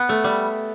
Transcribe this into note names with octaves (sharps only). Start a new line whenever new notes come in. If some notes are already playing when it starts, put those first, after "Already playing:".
Already playing: B3
A3
G3